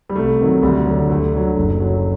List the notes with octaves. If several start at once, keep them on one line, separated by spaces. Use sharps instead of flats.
G3
C2 A3
C3 D#3 F#3
D2 G3
D3 F#3
D2 A3
D3 F#3
F#1
F#2 F#3